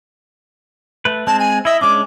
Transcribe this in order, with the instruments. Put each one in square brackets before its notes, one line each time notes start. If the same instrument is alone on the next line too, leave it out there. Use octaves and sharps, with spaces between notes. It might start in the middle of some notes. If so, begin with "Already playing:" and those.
[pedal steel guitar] A3 B4
[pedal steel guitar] G#3 C4 [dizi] A5
[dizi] G#5
[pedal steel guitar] E4 D#5 [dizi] E5
[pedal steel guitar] G#3 C#4 D4 [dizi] D6